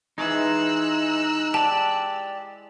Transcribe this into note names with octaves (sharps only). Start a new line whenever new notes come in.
E3 G#3 D#4 G#4 E6 F#6
G4 D5 A5